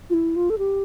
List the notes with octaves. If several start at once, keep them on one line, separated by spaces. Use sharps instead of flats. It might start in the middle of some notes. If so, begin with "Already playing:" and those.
F4
E4
F4
A4
G4